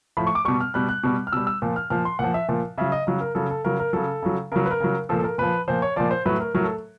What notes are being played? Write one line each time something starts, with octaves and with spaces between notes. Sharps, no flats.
A2 F3 B5
C#6
D6
B2 G3 C#6
F6
B2 G3 F#6
F#6
B2 G3
F6
B2 G3 E6
E6
A#2 F3
F6
A#2 F3 F6
C6
A#2 F3 F#5
E5
A#2 F3
C#3 F#3 E5
D#5
C#3 F#3
A#4
C#3 F#3 A4
A4
C#3 F#3 A#4
A#4
C#3 F#3 A4
C#3 F#3
C#3 F#3 A#4
B4
A#4
C#3 F#3
A#2 F3 A4
A4
A#4
A#2 F3 B4
A#2 F3 C5
C#5
A#2 F3 D5
C5
A2 F#3 B4
A#4
A2 F#3 A#4
A4